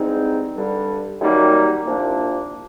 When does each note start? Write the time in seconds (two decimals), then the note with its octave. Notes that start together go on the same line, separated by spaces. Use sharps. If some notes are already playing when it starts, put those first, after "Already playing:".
Already playing: G#2 E3 G3 C4 D#4
0.54 G2 D3 G3
1.20 F#2 D#3 G3 A#3 D#4
1.86 C2 A#2 F3 A#3 D4